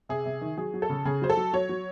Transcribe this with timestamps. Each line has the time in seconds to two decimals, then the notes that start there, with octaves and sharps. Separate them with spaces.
0.09 C3 G#4
0.25 C3
0.41 D#3
0.57 F#3 G#4
0.74 F#3
0.82 A4
0.89 C#3
1.05 C#3 G#4
1.22 F#3 C5
1.30 A4
1.37 F#3
1.53 F#3 C#5
1.69 F#3